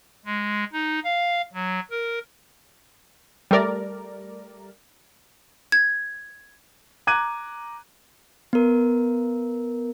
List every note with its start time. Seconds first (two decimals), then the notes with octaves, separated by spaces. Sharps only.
0.25 G#3
0.73 D#4
1.04 F5
1.54 F#3
1.91 A#4
3.51 G3 A3 A#4 D5
5.72 G#6
7.07 A#5 D6 F#6 G#6 D#7
8.53 B3 A#4